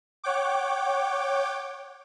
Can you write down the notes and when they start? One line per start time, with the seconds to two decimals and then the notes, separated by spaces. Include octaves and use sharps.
0.24 C#5 F#5 G5 D6